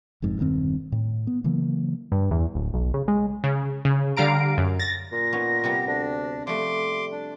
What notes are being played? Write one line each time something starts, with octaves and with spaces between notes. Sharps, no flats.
F#1 F2 G#2
E1 G2 D#3 C4
A2
B3
C#3 E3 F#3 A#3
G2
E2
D1
B1
C#3
G#3
C#3
C#3
D3 G3 F5 A#5 D7
F#2
A6 A#6
A#2 A#6
B3 C#4 D#4
C3 G3 B3 G4
D2 D4
F3 G3 A3 E5 C6 D6
D4